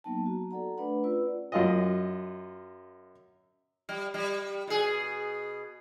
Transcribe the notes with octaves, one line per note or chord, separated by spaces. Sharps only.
F#3 A#3 B3 D#4 G5 A5
F#4 A#5
A4 D5 F#5 A#5
A3 D4 B4 D5 F#5 B5
C#4 F4 B4 D5 E6
F#2 F4 D#5
G3
G3
B2 G#4